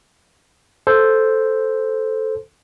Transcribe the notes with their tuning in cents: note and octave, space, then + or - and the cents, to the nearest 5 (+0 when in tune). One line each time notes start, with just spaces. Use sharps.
A4 +0 C5 +0